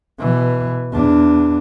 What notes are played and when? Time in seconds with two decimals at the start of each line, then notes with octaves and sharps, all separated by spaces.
0.19 B2 E3
0.92 E2 D4